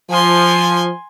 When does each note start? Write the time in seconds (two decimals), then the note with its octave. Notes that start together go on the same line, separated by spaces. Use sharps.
0.10 F3 G#5 C6